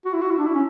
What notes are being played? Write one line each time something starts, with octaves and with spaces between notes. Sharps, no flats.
F#4
E4
F#4
E4
D4
E4
C#4